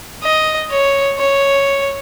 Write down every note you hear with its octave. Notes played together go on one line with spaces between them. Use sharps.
D#5
C#5
C#5